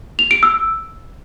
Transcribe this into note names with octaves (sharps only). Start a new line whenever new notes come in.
F7
D7
E6